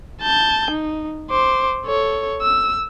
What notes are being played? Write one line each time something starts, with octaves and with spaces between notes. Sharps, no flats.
A5 G6
D#4
C5 D6
A4 C#5
E6